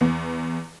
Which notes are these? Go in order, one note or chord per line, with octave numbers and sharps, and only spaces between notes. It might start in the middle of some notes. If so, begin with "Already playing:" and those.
E2 B3